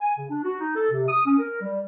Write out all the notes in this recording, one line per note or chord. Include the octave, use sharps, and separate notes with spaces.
G#5
C#3
D4
F#4
D#4
A4
C3
D#6
C#4
A#4
G3